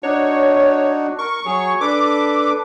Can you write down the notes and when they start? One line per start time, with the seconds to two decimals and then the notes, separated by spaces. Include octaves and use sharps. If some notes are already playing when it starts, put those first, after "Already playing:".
0.03 D4 D#4 F#4 C#5
1.18 A#4 C#6
1.45 F#3 G#4 C#5
1.81 D4 A4 B4 D6